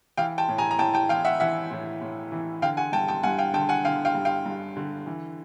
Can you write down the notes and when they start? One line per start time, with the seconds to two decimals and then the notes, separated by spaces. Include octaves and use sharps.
0.17 E3 F5 G5
0.38 G5 A5
0.48 A2
0.58 G#5 A#5
0.71 A#5
0.79 A2 G5 A5
0.94 G5 A5
1.09 E3 F5 G5
1.25 E5 F#5
1.40 E3 E5 F#5
1.71 A2
2.02 A2
2.32 E3
2.62 D3 F5 G5
2.77 F#5 G#5
2.92 G2 G5 A5
3.08 G5 A5
3.23 G2 F#5 G#5
3.39 F5 G5
3.53 D3 G5 A5
3.69 F#5 G#5
3.85 D3 F5 G5
4.05 F5 G5
4.15 G2
4.25 F5 G5
4.46 G2
4.77 D3
5.06 E3